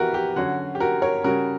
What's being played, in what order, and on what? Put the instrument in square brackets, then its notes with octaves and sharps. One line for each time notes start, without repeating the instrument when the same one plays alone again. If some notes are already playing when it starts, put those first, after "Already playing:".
Already playing: [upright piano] E3 B3 F#4 G4 A#4 B4
G4
D3 F#3 C#4 F#4
G4
F#4 A#4
A#4 C#5
C#3 G3 C#4 F#4 A#4